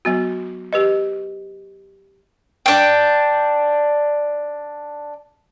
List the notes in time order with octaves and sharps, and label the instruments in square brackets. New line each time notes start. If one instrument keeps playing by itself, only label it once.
[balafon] F#3 B3 F#4
G4 B4 D#5
[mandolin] D4 G5